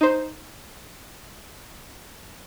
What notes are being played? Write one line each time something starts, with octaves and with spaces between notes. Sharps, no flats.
D#4 C5